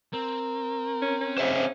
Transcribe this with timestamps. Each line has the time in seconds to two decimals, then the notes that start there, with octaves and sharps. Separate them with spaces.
0.13 C4 A#4
1.02 C#4
1.21 C#4
1.38 G#2 C5 E5 F5